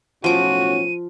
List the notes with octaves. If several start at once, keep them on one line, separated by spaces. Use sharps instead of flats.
B1 A2 F3 C#4 F#4 D6 D#7